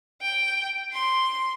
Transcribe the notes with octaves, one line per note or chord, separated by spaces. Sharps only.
G5
C6